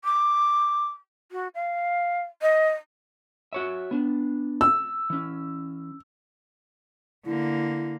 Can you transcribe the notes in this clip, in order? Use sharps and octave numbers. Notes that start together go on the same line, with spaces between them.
D6
F#4
F5
D#5
F#4 C#5 E5
B3 D4
E6
E3 C#4
D3 A#3 E4